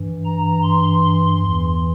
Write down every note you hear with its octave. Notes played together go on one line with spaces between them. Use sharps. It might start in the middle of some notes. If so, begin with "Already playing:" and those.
Already playing: G2 E3
A#5
C6
E2 E3